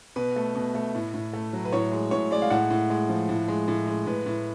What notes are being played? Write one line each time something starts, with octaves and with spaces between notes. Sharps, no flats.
B2 B4
A3
B2
A3
A2
A2
A3
F#3
B4
A2 C#5
G#3
A2 C#5
G#3 D5
F5
A2 F#5
A2
G#3
F3
A2
G#3
A2
G#3
A2 B4
A2